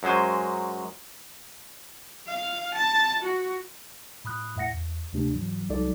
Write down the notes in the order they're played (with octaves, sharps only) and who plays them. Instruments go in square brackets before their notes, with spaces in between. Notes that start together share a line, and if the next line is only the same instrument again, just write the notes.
[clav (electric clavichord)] F#2 F#3 G#3 C5 G#5
[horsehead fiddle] F5
A5
F#4
[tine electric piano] A2 B5 D#6 F#6
F2 A2 E5 F#5 A#6 C#7
E2
D2 C3 A3 D4 G4
G#2 E3 F#3
C2 F#3 G#3 D#4 A4 D5